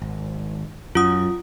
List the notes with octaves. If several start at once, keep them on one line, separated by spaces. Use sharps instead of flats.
G#1
F#2 F4 F#5 D#6